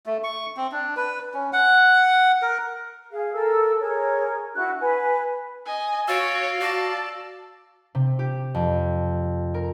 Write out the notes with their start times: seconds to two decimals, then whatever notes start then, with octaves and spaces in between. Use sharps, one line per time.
0.06 A3
0.24 C#6
0.57 C4
0.72 D4
0.97 B4
1.34 C#4
1.53 F#5
2.42 A#4
3.11 G#4 F5
3.33 A4 A#4 E6
3.80 G#4 A#4 C#5
4.55 D4 E4 F#4 F#6
4.79 B4 G#5
5.65 D#5 G#5
6.08 F#4 C#5 F5 E6 A6 D7
6.60 F#4 D5 A5
7.95 C3
8.19 G4
8.54 F2
9.54 A#4